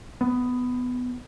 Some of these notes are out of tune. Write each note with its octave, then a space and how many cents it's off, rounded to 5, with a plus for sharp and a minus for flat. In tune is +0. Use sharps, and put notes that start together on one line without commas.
B3 +10